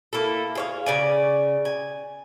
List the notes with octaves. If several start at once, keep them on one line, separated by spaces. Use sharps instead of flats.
A#3 E4 A4
G#4 C#5 F5
C#3 D5 G#5
G#5